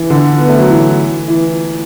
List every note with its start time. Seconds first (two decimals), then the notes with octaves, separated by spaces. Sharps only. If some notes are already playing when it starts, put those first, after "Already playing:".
Already playing: E3
0.10 D3
0.38 B3
0.48 A3
0.59 F#3
0.69 E3
1.28 E3